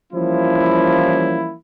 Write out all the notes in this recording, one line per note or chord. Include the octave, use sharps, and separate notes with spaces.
E3 F3 G3 A#3 C#4 E4